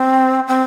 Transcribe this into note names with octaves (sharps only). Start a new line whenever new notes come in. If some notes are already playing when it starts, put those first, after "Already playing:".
Already playing: C4
C4